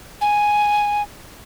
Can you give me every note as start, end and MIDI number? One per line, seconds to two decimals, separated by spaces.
0.21 1.02 80